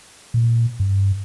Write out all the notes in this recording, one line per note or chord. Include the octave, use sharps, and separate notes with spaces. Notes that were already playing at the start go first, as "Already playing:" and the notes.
A#2
G2